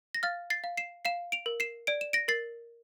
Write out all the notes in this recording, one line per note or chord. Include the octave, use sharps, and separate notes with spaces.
A#6
F5 F6 A6
A6 C7
F5
C7 E7
F5 C7 E7
D7 F7
A#4
C7 E7
D5 D7
E7
A#6 D7
A#4 A6 C7